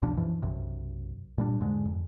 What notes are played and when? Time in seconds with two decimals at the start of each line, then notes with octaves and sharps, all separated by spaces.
0.02 C#2 B2 F3 D4
0.17 F#2 E3 F3
0.42 B1 F#2 C3
1.38 A#2 G3 D4
1.60 E2 G#2 D3 G#3
1.85 F2